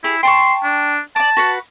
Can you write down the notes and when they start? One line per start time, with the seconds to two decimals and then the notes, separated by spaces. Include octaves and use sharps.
0.04 E4 G4 G#4
0.23 G5 A5 C6 C#6
0.64 D4
1.16 D5 A5 D6
1.37 F#4 B4 F#5